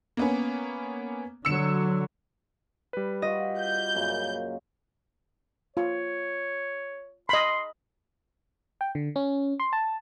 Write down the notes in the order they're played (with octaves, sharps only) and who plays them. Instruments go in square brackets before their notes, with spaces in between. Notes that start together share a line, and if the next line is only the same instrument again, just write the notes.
[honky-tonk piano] A#3 B3 C#4
[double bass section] D3 F#3 [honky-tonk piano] E6 C#7 E7
[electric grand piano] G3 B4
[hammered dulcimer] F4 F#4 [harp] D#5
[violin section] G6
[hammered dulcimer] F#2 A#2 C#3
[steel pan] F4 [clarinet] C#5
[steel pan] D#5 B5 [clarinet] C6
[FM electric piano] G5
D3
C#4
C6
A5